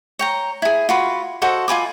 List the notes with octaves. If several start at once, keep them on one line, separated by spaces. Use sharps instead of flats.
C#5 G5 A#5
E4 G#4
F4 F#4 B5
F#4 A4 C5 D#5
F4 G#5 B5 D6